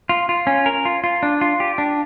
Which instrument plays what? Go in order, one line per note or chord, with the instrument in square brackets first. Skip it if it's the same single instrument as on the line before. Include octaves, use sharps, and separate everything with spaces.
[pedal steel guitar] F4
F4
C#4
A#4
F4
F4
D4
F4
G4
D4